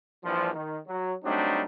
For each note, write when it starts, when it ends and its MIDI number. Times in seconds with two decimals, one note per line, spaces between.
0.24 0.50 34
0.24 0.50 43
0.24 0.50 52
0.24 0.50 53
0.53 0.76 51
0.87 1.12 54
1.24 1.62 54
1.24 1.62 55
1.24 1.62 57
1.24 1.62 60
1.24 1.62 62
1.24 1.62 63